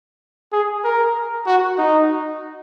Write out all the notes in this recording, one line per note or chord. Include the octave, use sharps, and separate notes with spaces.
G#4
A#4
F#4
D#4